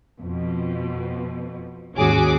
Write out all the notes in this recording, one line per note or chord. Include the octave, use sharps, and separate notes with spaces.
F2 B2
D#2 G#2 C#4 F#4 G#4 D6